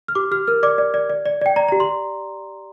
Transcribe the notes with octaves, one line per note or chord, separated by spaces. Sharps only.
F6
G4 D6
G4 F6
A#4 F6
D5 D6
D5
D5
D5
D5
D5 G5
D5 A#5
A#5
G4
C6